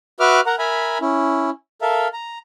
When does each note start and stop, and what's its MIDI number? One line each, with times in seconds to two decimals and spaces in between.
0.20 0.41 66
0.20 0.41 71
0.20 0.41 76
0.20 0.41 86
0.20 0.41 89
0.46 0.56 70
0.46 0.56 78
0.46 0.56 82
0.59 0.98 70
0.59 0.98 76
0.59 0.98 80
0.59 0.98 82
0.59 0.98 83
1.01 1.50 61
1.01 1.50 64
1.82 2.08 69
1.82 2.08 70
1.82 2.08 76
1.82 2.08 77
2.13 2.38 82